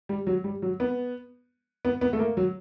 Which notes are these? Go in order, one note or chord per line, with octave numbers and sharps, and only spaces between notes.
G3
F#3
G3
F#3
B3
B3
B3
A3
A#3
F#3